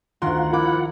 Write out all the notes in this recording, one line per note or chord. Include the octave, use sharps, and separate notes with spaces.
D2 D#3 F4 F#5 C6
F3 E4 A#4 D6